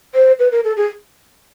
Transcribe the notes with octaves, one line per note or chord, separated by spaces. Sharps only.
C5
B4
A#4
A4
G#4